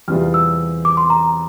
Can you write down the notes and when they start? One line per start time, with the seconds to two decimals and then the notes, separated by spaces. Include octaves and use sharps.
0.08 E2 C3 G3 C4 F4 F6
0.34 E6
0.85 D6
0.97 C6
1.10 A#5